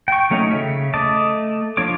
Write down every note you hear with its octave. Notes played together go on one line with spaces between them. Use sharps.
G5 C#6
F#3 A3 C#4 D#4
C#3 E5
A3 D#5 A5 D6
F3 D4 C#5 D6